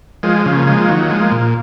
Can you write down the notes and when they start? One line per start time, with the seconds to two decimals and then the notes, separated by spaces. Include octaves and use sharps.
0.23 F3 G#3 G#4
0.46 C#3 F3
0.55 A#3
0.67 F3 G#3
0.88 D#3 F#3 F4
1.10 F3 G#3
1.21 A#3
1.31 A#2